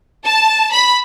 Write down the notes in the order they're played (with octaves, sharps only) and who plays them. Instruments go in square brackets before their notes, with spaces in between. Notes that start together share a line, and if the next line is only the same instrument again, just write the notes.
[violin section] A5
B5